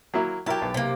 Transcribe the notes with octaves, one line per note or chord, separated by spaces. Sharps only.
F#3 A#3 E4
F#3 E4 G4 A#4 A5
B1
C3 A#3